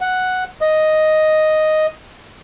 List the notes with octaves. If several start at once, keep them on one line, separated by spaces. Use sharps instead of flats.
F#5
D#5